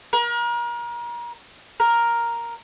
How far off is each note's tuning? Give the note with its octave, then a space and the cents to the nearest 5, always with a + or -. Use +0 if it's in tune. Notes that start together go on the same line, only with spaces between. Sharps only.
A#4 +35
A#4 +5